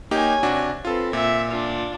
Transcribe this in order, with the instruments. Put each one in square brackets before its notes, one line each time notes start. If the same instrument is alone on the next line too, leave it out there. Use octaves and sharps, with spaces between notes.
[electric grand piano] A#3 D#4 G4 [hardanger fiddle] C#5 G#5
[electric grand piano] C3 D4 F#4
[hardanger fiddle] C4 B4 [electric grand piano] F4 A4
[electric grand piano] A#2 [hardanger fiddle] E5
[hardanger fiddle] D4 F4